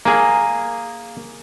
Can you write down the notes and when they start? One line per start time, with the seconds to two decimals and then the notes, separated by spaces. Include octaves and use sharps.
0.05 A#3 G#4